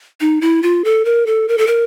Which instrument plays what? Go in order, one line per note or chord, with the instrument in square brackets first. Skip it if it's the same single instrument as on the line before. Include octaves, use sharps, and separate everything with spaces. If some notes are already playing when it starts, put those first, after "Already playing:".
[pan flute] D#4
E4
F4
A4
A#4
A4
A#4
A4
A#4